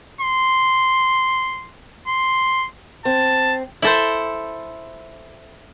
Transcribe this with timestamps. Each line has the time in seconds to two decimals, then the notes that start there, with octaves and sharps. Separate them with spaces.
0.21 C6
2.08 C6
3.05 C4 A5
3.82 E4 A4 C5